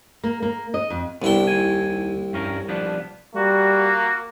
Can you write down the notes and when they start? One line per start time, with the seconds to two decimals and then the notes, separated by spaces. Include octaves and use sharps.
0.24 A#3
0.42 A#3
0.74 D#5
0.90 F2
1.22 C2 B3 D4 E4 G5
1.47 D#2 G#5
2.33 G2 C#4 A#4
2.68 F3 B3 D4
3.35 G3 A#3 F#4